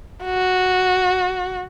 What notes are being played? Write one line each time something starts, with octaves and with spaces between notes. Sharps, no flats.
F#4